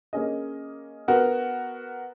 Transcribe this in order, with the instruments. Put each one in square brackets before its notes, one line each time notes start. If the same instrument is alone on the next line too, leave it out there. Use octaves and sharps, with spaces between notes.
[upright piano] A#3 C#4 G#4 D#5
B3 F#4 A#4